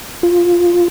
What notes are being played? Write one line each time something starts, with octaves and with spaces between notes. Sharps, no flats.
F4